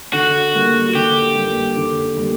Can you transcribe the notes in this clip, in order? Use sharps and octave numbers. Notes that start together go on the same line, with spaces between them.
D3 F#4
G3 A#3
D3 G4
G3 A#3
D3
G3 A#3